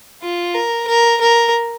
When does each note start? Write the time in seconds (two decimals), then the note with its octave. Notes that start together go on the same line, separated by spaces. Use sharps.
0.23 F4
0.55 A#4
0.88 A#4
1.21 A#4